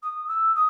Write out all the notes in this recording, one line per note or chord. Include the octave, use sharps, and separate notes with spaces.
D#6
E6
D#6